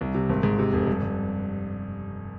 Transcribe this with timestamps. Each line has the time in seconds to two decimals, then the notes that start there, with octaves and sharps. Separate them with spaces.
0.01 C2
0.14 C3
0.29 G#1
0.43 G#2
0.59 C3
0.73 F1
0.87 G2
1.02 G2